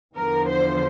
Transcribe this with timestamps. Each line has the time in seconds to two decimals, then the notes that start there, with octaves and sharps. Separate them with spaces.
0.15 E2 D3 F3 A#4
0.49 C5